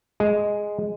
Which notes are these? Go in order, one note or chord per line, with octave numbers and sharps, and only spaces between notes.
G#3